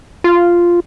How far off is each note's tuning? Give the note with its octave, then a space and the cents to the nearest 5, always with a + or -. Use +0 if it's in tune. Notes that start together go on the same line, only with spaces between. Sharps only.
F4 -5